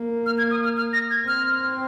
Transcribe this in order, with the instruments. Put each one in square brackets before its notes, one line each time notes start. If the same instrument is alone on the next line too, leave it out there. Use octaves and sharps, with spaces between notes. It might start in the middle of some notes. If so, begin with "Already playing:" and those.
Already playing: [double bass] A#3
[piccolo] F6
G#6
D#6
F6
F6
A#6
G#6
[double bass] C4 [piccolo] F6